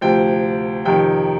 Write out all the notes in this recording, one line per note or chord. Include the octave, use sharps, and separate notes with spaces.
D2 C3 F3 G5
F2 C3 D#3 G5